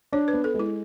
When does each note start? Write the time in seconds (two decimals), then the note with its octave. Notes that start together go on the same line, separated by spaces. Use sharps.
0.12 D4 C#5
0.28 B4
0.33 B3
0.44 A4
0.54 G#3
0.59 E4